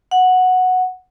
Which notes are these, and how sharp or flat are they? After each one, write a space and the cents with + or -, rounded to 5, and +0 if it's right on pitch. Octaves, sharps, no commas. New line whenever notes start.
F#5 -5